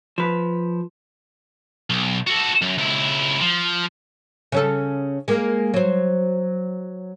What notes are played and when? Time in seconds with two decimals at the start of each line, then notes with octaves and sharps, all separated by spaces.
0.18 F3 B4
1.90 B1
2.27 F#4 A4
2.61 F#2
2.78 C#2 E4
3.41 F3
4.52 C#3 C#4 A4
5.28 G#3 A#3
5.74 F#3 C5